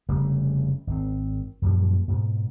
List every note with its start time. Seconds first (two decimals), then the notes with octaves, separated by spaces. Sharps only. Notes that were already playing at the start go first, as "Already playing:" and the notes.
0.09 F1 C#3 G3 A3
0.87 G#1 C4
1.62 F#2 A#2 F3 G3
2.08 G#2 B2